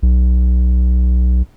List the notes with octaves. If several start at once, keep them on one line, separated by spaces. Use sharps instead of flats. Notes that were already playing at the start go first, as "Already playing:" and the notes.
B1